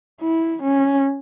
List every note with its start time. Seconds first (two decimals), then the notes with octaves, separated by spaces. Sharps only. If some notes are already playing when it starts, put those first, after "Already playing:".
0.21 E4
0.62 C#4